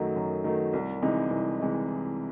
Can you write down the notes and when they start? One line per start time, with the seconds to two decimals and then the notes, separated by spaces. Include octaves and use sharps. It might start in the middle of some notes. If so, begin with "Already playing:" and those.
Already playing: F#2 D#3 F#3 A3 D#4
0.16 F#2
0.44 D#3 F#3 A3 D#4
0.73 C2
1.02 C3 E3 G#3 D#4
1.31 C2
1.60 C3 E3 G#3 D#4